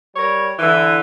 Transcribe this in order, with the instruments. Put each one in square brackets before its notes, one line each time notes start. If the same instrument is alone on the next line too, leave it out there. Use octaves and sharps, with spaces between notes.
[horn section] G3 A#4 C#5
D3 E3